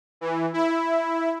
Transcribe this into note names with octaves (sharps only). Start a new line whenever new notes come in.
E3
E4